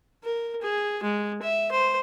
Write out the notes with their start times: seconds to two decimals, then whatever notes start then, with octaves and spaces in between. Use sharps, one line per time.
0.23 A#4
0.62 G#4
1.03 G#3
1.42 E5
1.71 C5